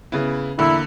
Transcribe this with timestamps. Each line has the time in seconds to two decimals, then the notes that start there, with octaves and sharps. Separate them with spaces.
0.12 C#3 B3 E4
0.59 E2 D3 A#3 E4